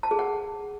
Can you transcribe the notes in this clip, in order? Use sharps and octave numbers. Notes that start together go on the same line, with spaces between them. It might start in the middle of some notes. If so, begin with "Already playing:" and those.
A5
G#4
F#5